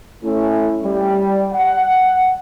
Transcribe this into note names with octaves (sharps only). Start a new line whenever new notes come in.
A3 C#4 E4
G3
F#5